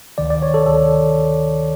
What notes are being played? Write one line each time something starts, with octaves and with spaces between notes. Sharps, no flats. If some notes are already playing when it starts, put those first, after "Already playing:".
D2 C3 D#3 D5
D5
C#5
A4
D2 C3 D#3 A4